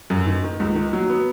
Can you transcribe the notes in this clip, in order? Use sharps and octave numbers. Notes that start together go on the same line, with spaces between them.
F#2
D#3
D#3
C#2
D#3
F#3
B3